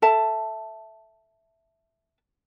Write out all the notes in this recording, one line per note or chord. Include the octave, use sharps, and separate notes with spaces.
A4 E5 A5